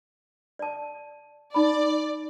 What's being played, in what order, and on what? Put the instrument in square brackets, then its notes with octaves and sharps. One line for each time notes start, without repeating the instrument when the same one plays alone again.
[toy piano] D5 A5
[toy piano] D#4 B5 [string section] D5